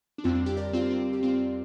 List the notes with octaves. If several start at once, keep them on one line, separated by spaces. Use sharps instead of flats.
D4
F2 D3 G3 C4 F4
D4
D4 G4
A#4 D5
C4 F4
C4
G4
C4 F4